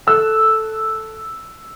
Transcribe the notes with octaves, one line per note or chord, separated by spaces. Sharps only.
A4 E6 F#6